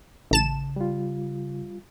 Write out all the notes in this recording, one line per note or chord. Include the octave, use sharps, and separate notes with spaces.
A1 C#3 A5 E7
G3 F4